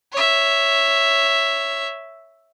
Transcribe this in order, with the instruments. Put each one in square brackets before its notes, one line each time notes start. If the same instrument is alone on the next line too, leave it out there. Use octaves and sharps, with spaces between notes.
[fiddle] C#5 E5